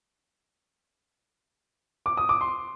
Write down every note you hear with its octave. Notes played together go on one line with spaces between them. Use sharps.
D6
D#6
D6
C6